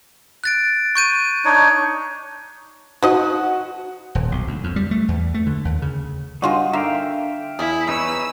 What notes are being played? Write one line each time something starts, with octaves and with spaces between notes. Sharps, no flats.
F#6 A6 D7
C#6 G6 D#7
D4 D#4 C#5
F3 D#4 F#4 D#5
D#1
B1
D2
F2
G3
A3
E2
A3
D3
D#2
C#3
G2 G#3 D#4 F4 F#4
D3 A#3 E5 F5 G5
E2 E4 G#4
D#4 B4 C#5 E6